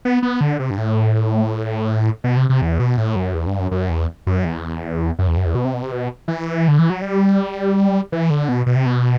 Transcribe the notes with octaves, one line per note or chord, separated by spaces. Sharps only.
B3
B3
D3
C3
G2
A2
B2
C3
C3
E2
B2
A2
F#2
E2
G2
F#2
F#2
E2
F#2
E2
F#2
E2
F#2
E2
B2
C3
B2
C3
B2
E3
D3
E3
F#3
G3
E3
D3
B2
B2
C3
B2